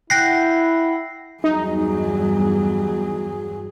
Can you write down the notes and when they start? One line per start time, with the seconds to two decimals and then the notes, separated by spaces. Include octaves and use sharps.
0.10 E4 F#5 G5 A#6 C7
1.44 E2 G2 F#3 G3 D#4 G#4